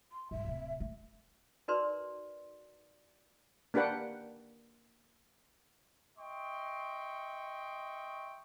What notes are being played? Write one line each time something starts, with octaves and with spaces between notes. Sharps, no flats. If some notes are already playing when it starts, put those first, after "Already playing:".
C6
G#2 G3 E5
D1 C3
A3
D#4 F#4 A#4 B4 D5 C6
A#3 D4 G4 B4 F#5 G5
D#5 E5 G5 C6 C#6